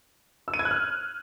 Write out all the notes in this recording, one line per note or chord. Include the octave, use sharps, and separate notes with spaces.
E6
D#7
G#6
F#6
F6